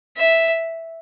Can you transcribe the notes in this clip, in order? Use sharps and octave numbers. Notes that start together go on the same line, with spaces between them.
E5